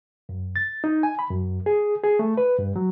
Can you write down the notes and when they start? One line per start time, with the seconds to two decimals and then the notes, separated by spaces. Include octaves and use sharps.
0.29 F#2
0.56 A6
0.84 D#4
1.03 G#5
1.19 B5
1.30 F#2
1.66 G#4
2.04 G#4
2.19 A3
2.37 B4
2.59 G2
2.76 F#3